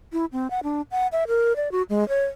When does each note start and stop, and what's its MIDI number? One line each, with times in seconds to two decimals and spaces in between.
0.13 0.25 64
0.32 0.50 60
0.50 0.60 78
0.63 0.82 62
0.91 1.07 78
1.12 1.24 76
1.28 1.56 70
1.56 1.71 74
1.72 1.82 66
1.90 2.07 56
2.09 2.25 73